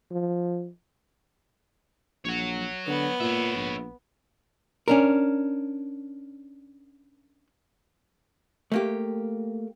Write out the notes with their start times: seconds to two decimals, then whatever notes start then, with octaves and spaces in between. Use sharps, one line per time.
0.11 F3
2.25 A#1 C#5 F#5
2.87 D3 B3
3.20 A#2 C#5 E5
3.55 A#1
4.88 C#4 D4 A#4
8.72 A3 A#3 G4